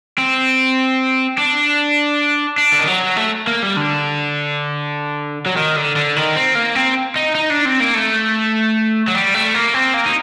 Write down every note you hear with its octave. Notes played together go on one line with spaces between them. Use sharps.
C4
D4
D4
D3
D#3
F#3
A3
A#3
G3
D3
F#3
D#3
D3
D3
D#3
C4
A#3
C4
D#4
D#4
D4
C4
A#3
A3
F#3
G3
A3
A#3
C4
A#3
D#4